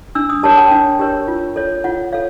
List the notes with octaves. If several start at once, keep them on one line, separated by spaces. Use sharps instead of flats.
D4 E6
D#6
G4 A#4 C#5 A5
G5
D4
G4 A#4 C#5
F4
A4 C#5
F4 F#5
A4 C#5 F5